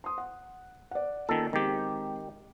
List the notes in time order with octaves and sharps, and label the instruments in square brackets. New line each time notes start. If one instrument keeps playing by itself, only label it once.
[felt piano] C6 D#6
F#5
D5 F#5
[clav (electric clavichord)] D#3 A4 [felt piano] A#3 C#4 F4
[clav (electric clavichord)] D#3 G4 [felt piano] G#3 C4